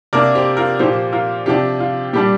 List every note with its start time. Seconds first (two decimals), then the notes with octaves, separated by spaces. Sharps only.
0.13 C3 A#3 D4 A#4 D5
0.35 G4 C5
0.57 F4 A#4
0.79 A#2 F3 A#3 G4 C5
1.12 F4 A#4
1.46 C3 F3 D4 G4
1.80 F4
2.13 A#2 G3 D4 G4